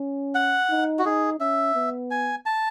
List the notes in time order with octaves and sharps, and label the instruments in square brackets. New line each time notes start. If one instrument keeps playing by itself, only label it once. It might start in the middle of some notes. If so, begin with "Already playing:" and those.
Already playing: [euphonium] C#4
[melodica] F#5
[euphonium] D#4
[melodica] F#4
[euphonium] D#4 [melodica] G#4
[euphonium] C#4 [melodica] E5
[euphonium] B3
[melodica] G#5
A5